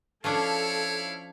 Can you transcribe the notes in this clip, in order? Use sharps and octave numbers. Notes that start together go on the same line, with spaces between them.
F3 C#4 D4 E4 A4 C#5 F5